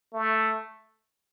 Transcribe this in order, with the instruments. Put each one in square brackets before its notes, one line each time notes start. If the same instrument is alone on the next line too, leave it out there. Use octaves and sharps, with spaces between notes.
[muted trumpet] A3